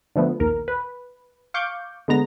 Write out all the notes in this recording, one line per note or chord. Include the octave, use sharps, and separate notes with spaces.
D3 F3 A3 B3
A#1 D#2 A#4
B4
F5 C#6 D6 G6
D3 G#3 B3 A#5 A#6